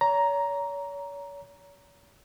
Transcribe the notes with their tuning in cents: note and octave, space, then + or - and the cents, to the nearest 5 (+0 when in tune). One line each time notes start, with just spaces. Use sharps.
C#5 +40 A#5 +5